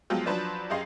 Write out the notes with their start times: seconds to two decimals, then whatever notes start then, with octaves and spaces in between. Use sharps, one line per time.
0.10 F3 F#3 G#3 B3 F4 G4
0.26 F3 F#3 D4 B4 C5 D5
0.70 F#2 G4 G#4 D#5 F5 C6